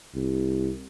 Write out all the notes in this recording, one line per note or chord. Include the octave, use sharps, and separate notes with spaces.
C2